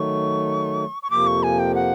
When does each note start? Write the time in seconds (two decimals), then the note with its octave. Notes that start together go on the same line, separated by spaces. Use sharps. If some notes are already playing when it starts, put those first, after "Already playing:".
Already playing: D#3 F#3 A3 C#6
1.02 C#6
1.10 F2 C3 F3 A#3 D6
1.27 C#6
1.43 G#5
1.59 G5
1.75 F#5